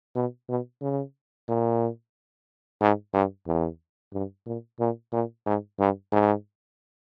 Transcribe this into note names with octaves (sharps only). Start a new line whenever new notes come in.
B2
B2
C#3
A#2
G#2
G2
E2
G2
A#2
A#2
A#2
G#2
G2
G#2